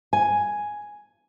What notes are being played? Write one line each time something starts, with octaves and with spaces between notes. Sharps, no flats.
G#5